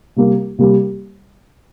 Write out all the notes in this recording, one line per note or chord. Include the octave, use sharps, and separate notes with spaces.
C3 G3 A#3
C3 G3 A#3